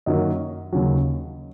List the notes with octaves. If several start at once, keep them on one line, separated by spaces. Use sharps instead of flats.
F#2 D#3 F#3 A#3 D#5
D#2 C#3 F#3